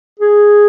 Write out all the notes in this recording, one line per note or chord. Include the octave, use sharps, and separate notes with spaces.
G#4